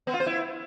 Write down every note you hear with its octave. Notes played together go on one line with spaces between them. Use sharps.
B3
F4
C5
E4